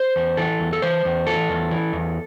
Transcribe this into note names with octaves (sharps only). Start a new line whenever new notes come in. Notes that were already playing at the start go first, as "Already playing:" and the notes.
Already playing: C5
E2
E3 A4
E2
A4
E3 C5
E2
E3 A4
E2
E3
E2